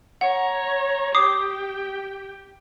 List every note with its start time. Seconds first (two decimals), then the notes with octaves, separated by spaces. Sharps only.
0.21 C#5 F#5 A#5
1.15 G4 G5 D6 D#6 C7